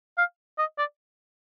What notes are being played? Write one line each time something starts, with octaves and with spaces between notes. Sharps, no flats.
F5
D#5
D5